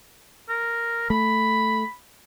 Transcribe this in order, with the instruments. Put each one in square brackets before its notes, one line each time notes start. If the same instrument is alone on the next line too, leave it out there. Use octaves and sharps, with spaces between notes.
[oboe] A#4
[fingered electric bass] A3 [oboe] B5